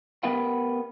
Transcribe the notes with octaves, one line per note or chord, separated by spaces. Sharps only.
B3 G4 A#4 B4 F#5 G5